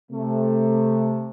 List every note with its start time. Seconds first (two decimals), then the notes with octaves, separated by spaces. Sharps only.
0.11 C3 A3